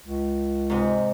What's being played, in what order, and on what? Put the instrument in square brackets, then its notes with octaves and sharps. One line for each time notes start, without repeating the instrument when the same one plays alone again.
[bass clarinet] C#2
[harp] G#2 C3